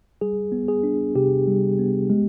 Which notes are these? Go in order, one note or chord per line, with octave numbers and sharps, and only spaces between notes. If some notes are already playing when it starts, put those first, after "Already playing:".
G3 G#4
B3
G#4
D4
C3 G4
G3
B3
G#3